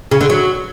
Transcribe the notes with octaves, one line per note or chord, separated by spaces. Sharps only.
C#3
D3
F#3